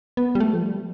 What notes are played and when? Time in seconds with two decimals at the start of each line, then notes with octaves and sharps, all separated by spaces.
0.17 B3
0.35 G3
0.40 A3
0.53 F3
0.63 G3